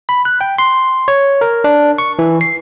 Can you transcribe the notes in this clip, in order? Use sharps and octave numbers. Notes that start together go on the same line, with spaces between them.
B5
F#6
G5
C6
C#5
A#4
D4
C#6
E3
C7